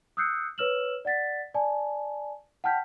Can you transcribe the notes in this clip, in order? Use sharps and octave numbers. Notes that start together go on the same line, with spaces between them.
D#6 E6 F#6 G6 C7 C#7
B4 C#5 E6 F6 E7 F#7
D5 F#5 A6 B6
D5 G#5 A5
F#5 G5 A5 F6 G6 B6